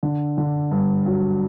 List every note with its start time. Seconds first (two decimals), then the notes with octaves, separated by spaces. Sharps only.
0.03 D3
0.38 D3
0.71 G2
1.06 F#3